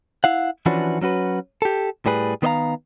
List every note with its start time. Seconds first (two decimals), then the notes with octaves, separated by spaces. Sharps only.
0.24 E4 F5 F#5
0.66 E3 F3 C#4 D4 F#4 B4
1.01 F#3 C#4 F#4 B4
1.62 G4 A4
2.06 A2 G3 G#4 B4
2.42 D#3 B3 C5 D#5 F5 A#5